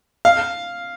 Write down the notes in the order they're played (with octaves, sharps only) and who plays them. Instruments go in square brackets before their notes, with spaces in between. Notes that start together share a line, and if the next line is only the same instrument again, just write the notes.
[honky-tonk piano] F5